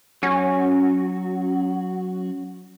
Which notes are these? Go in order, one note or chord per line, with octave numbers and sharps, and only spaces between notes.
F#3 C#4 F#4